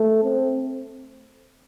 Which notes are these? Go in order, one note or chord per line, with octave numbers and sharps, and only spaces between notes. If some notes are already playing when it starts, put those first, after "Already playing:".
Already playing: A3
C4